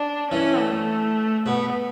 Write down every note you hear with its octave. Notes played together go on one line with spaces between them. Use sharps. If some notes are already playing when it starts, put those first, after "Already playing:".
Already playing: D4
E3 C#4
A3
B2 B3